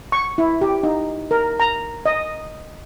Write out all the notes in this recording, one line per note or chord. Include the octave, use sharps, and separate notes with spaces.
C#6
E4
G4
D#4
A#4
A#5
D#5